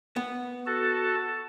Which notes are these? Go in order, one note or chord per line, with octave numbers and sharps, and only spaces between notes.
B3
F#4 A4 A5